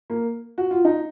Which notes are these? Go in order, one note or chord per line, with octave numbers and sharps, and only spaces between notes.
A#3
F#4
F4
D#4